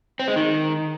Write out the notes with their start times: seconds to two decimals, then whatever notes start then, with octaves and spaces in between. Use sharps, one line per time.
0.20 C4
0.28 G#3
0.36 D#3